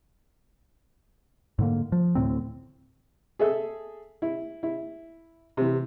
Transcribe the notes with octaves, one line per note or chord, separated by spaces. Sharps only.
G#2 D3 A#3
F3
D2 A2 F#3 C4
G#4 A4 E5
E4
E4
C3 E3